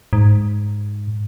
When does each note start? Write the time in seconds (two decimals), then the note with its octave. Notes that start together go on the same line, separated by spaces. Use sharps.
0.13 G#2